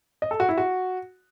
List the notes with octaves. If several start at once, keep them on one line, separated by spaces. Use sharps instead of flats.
D#5
A4
F#4
E4
F#4